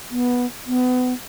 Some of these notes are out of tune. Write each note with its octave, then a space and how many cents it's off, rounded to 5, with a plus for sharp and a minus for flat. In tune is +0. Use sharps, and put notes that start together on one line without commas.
B3 -10
B3 +30